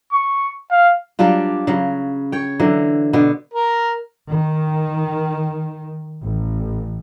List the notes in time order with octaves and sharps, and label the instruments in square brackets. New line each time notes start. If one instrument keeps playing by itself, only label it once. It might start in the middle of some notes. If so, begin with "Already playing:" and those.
[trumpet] C#6
F5
[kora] F#3 G3 D4 F4
C#3 F#3
C#5 G5
D3 E3 F#3
B2 D3 B3
[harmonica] A#4
[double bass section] D#3
A1